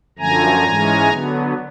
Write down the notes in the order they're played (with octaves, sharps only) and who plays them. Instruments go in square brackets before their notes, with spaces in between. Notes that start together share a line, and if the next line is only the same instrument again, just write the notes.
[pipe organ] F#2 D3 F3 A3 G#5 A#5
G#2 E3 G#3 C#4
D3 F#3 B3